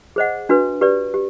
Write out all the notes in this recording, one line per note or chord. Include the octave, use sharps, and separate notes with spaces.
G#4 C5 D#5 F#5
D4 F#4 B4
G4 B4 D5
G4